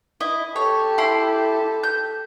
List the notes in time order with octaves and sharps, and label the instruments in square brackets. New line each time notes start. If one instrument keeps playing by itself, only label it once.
[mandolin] E4 D#5
[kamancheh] G4 A4 [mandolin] C#5
[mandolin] E4 B5 C6
G6